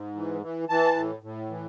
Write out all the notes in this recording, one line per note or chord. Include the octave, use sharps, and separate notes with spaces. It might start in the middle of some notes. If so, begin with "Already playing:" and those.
Already playing: G#2
E3
E3
E3 A5
A2
A2
E3